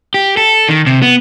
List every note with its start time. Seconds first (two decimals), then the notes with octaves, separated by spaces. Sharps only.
0.14 G4
0.37 A4
0.69 D#3
0.87 C3
1.02 B3